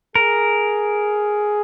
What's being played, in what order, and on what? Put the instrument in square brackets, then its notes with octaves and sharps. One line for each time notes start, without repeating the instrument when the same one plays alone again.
[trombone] G#4 [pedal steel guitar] A#4